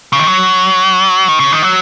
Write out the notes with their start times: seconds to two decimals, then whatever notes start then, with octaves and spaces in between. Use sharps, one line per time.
0.13 C#3
0.19 D#3
0.27 F#3
1.28 D#3
1.40 C#3
1.52 D#3
1.63 F#3